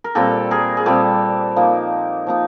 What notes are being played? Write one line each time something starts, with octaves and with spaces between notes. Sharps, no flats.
A#4
A#2 G3 C4 G4 A4
G#4 A#4
G#4
A#2 G3 C4 G4 A4
F3 A#3 D#4
F3 A#3 D#4